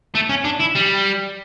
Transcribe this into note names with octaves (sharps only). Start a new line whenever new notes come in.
A3
C#4
D4
E4
G3